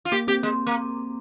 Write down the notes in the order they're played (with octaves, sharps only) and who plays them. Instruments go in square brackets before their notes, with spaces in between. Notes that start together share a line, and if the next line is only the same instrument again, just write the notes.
[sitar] F4
[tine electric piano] A#3 [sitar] G4
[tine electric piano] C4 [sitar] G4
[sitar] G#3
A#3